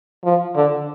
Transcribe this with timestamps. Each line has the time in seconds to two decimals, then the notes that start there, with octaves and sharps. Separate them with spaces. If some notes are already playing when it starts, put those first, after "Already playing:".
0.24 F3
0.55 D3